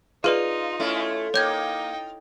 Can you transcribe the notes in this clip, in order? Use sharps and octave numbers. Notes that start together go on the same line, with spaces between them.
D#4 F4 G#4 B4 D5
A3 C#4 E4
A#3 D#4 C#5 G5 G6 G#6